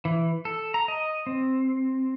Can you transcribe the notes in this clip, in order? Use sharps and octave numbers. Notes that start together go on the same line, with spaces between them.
E3
A4
A#5
D#5
C4